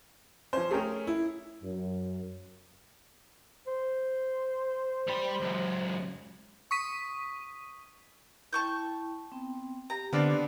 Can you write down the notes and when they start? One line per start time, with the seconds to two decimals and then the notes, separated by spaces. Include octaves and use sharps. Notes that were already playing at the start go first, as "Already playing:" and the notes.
0.53 F3 C#4 C5
0.71 A3 C#4 G#4 A#4 G5
1.07 E4
1.63 F#2
3.67 C5
5.08 G3 B5
5.41 C#2 F#2
6.71 C#6 D#6 B6 D#7
8.53 E4 G5 A5 C#6 G6
9.32 B3 C4 G5
9.90 G4 A#5
10.13 D3 B3 C4 D4 F4 D5